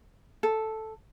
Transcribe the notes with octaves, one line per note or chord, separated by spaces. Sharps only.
A4